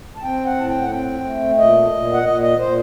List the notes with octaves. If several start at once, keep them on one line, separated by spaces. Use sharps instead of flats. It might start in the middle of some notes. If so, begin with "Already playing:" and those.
A5
C4 G5
F#5
A2 A5
G5
F#5
C4 G5
A3
A#2 D#5
A#2
F#5
A#2 D#5
D#5
A#2 C5